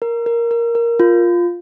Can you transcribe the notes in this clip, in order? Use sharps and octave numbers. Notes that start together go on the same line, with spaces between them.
A#4
A#4
A#4
A#4
F4